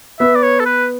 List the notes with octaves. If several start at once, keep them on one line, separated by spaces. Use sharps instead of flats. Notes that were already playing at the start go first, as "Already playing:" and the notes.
B3 E5
D5
C#5
A4
B4